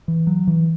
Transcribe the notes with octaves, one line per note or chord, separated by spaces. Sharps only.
E3
F#3
E3